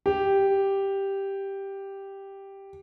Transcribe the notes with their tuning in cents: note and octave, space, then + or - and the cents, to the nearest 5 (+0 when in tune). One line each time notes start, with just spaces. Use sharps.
G4 +0